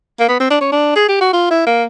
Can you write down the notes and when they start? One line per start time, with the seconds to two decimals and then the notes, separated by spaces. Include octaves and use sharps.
0.20 A#3
0.29 B3
0.40 C4
0.50 D4
0.61 C#4
0.72 D4
0.96 G#4
1.09 G4
1.21 F#4
1.33 F4
1.51 E4
1.67 A#3